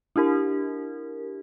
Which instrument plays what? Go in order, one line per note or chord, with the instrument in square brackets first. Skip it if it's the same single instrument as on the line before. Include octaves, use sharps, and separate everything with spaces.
[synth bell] D4 E4 G4 A#4